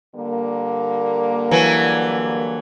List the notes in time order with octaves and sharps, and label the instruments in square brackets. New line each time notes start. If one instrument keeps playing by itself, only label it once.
[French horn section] D3 G3 A#3
[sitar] E3 F#3